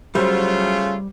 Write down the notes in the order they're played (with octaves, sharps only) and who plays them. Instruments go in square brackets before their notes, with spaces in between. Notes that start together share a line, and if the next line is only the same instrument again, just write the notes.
[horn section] C#3 A3 F4 [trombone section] F#3 [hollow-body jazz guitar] G3 [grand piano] C5